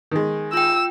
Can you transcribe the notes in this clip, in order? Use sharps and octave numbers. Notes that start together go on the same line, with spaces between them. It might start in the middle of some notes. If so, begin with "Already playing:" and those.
D#3 G#3
F4 G5 E6